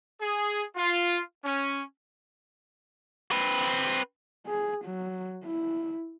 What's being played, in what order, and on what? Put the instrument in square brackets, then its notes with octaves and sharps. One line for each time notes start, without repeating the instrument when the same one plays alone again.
[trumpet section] G#4
F4
C#4
[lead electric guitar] C4 B4
[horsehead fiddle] G#4
F#3
E4